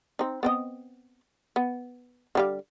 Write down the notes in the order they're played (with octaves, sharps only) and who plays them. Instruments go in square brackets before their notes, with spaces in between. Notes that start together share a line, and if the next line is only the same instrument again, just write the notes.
[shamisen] C4 D#4
B3 C4 D#5
B3
D3 G3 F5